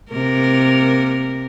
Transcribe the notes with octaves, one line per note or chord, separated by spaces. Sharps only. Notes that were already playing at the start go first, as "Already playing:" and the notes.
C3 A#3 A#4